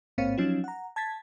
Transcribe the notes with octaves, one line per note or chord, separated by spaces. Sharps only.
A1 G#2 A#3 C4 C#5 F5
F3 F#3 C#4 D#4 F4
F#5 A#5
A5 G#6 A6 B6